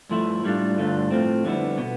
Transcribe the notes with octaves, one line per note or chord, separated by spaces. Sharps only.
G2 F3 A3 E4
A2 G3 D4 F4
G2 D3 A3 D4 F4
A2 F3 A3 C4
F2 D3 G3 B3 E4
B2 B3